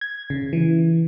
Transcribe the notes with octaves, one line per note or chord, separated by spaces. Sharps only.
G#6
C#3
E3